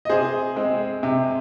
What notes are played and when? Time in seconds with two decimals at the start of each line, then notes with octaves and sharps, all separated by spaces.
0.05 D#5
0.09 C3 G#4 C5
0.56 G#3 C4
1.03 C3